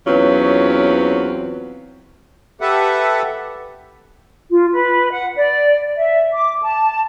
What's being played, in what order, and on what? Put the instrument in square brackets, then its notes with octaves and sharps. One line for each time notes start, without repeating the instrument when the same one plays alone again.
[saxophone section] E2 F#3 C4 C#4 F4 B4
[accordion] G4 A4 B4 E5 F#5
[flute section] F4
B4
F#5
D5
E5
D6
A5